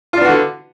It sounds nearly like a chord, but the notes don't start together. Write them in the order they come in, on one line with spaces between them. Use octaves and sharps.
F4 D4 B3 F#4 D3